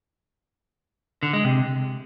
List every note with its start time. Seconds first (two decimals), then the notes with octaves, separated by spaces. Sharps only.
1.23 D3
1.33 G#3
1.44 C3